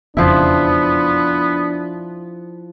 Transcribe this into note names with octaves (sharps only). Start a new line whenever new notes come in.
E1 F2 C#3 F3 B3 D4 E4